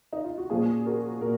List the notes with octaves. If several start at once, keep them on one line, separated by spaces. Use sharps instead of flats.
D#4
F4
F#4
A#2 F3 A#3 C#4 F4 G#4
F#4 A#4
A#2 A#4